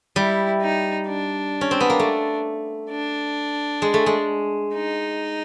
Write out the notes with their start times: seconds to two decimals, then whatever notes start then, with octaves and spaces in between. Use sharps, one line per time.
0.16 G3 E4
0.62 D#4
1.08 D4
1.61 C#4
1.71 C4
1.80 B3
1.90 A#3
1.99 A3
2.90 D4
3.82 G#3
3.94 A3
4.06 G#3
4.74 D#4